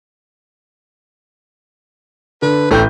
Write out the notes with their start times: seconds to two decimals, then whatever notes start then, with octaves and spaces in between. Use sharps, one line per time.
2.42 D3 B4
2.71 A1 A3 G5 G6